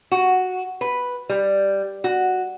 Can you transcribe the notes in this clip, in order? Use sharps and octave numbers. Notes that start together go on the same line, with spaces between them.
F#4
B4
G3
F#4